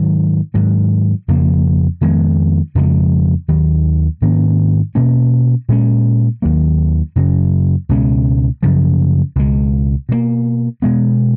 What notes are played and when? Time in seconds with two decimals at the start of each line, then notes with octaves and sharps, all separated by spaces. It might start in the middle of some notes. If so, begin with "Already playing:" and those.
Already playing: G#2 D#3 F#3
0.54 G#2 D#3 F#3
1.28 F2 C#3 F3 A#3
2.01 F2 D#3 G#3 B3
2.75 F2 C#3 F3 G#3
3.48 D#2 D#3 F#3
4.22 G#2 D#3 A#3 C#4
4.95 B2 A#3 C#4
5.69 A#2 G#3 C#4
6.42 D#2 D#3 F#3 A#3
7.16 F#2 C#3 F#3 C#4
7.89 C#2 B2 G#3 C#4
8.63 F#2 C#3 F3
9.36 C#2 B2 G#3
10.09 B2 F#3 A#3
10.82 B2 G#3 B3